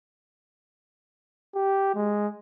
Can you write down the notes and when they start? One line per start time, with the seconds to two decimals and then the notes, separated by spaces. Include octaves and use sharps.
1.55 G4
1.95 G#3